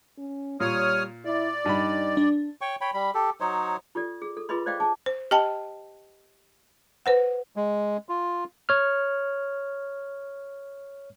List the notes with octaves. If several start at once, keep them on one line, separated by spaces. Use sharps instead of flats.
C#4
A#2 G3 C#5 D#6 F6
E4 D5
G2 D#4 B5
D4
C#5 G5 C#6
C#5 G5 B5
G3 B5
G4 A4
F#3 D#4 C5 C#5
F4 G4 A4 D5
G#4
A4
F4 G#4 B4 D#5 B5 C6
C5 D5 D#5 F5 G5 D6
G#4 A5 D6
C5
G4 D#5 G5 A5
B4 C5 F#5
G#3
F4
C#5 F6